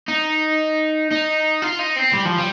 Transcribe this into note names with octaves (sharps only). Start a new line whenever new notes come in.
D#4
D#4
F4
D#4
C4
G3
F3
G3